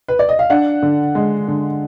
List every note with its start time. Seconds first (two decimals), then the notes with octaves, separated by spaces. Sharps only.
0.08 B4
0.19 D5
0.29 D#5
0.39 F5
0.50 D4 F#5
0.82 D3
1.15 G#3
1.48 D3